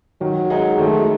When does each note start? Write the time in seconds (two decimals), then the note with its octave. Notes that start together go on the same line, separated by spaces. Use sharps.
0.21 D#3 F#3
0.50 G#3 D#4 G#4
0.79 D#3 A3